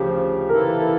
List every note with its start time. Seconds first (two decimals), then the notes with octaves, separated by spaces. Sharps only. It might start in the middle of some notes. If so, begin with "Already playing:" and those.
Already playing: D2 C#3 F3 G4
0.48 E3 A#3 E4 A4 A#4